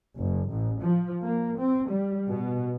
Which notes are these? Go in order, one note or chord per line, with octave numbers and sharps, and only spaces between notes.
F#1
A1
F3
A#3
C4
G3
B2